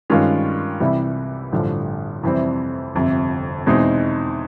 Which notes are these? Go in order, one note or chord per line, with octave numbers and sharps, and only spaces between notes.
G2 D#3 G#3 C#4 F4
C2 C3 E3 G3
A1 G2 D3 F3
F2 C3 E3 G3 C4
G1 F2 C3
E2 B2 G#3 C4 D#4